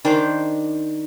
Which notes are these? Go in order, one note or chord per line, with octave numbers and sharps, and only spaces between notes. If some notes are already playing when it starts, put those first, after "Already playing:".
D#3 D4 C5 D6